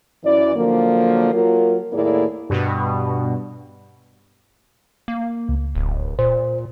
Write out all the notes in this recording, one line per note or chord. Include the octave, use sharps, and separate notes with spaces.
F#2 E3 D5
D3 F3 F#3 A#3
F#3 A#3 F4 A#4
D#2 A2 A#3 E4 G#4 D5
G2 B2
A#3
C#2
D1
A#2 C5